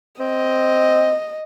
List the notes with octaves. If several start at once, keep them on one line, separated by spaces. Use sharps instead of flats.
C4 D#5